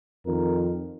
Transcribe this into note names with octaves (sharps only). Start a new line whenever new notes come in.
F2 D#3 A#4